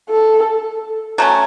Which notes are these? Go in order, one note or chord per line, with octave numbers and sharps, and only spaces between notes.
A4
F#3 A3 C#4